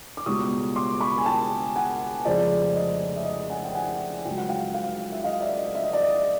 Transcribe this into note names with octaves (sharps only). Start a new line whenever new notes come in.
D6
C#2 B2 G3 B3 C#6 D#6
C6 D6
B5 C#6
G#5
G5 A5
F#5 G#5
F1 F2 C#3 F3 G#3 D5
D#5
E5
D#5
F#5 G#5
G5
F#5 G#5
C#2 C#3 F#3 G5
F#5
F5 G5
F5 G5
E5
D#5 F5
D5 E5
D#5
E5
D#5
D5
D#5